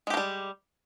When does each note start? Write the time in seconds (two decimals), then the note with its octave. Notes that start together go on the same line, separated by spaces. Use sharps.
0.07 G#3
0.10 G4
0.14 A#3
0.17 G3